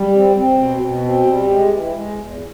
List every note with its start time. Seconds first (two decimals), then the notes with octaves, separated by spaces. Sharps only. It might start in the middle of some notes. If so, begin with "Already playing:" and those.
Already playing: G3
0.14 C4
0.36 C4
0.58 B2
0.81 B2
1.04 C4
1.26 G3
1.49 G#3
1.71 E3
1.94 G#3
2.17 E2